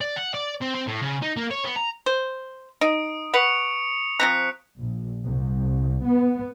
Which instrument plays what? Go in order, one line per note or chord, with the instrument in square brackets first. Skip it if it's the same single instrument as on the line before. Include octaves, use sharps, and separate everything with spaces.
[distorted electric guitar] D5
F#5
D5
C4
C4
A2
C#3
D#4
A#3
C#5
B3
A#5
[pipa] C5
[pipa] D#4 [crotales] D#6 D7
[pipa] B4 F#5 [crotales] C#6 C#7 F7
[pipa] F3 C4 A#5 [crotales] F#6 B6 C#7
[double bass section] A#1
C2
B3